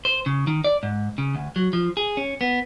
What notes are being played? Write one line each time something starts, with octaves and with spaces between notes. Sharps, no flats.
C5
C#3
D#3
D5
G#2
C#3
D2
F#3
F3
G#4
C#4
B3